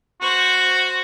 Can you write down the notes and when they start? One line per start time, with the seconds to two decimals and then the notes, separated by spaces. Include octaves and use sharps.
0.21 F#4 C5 C#6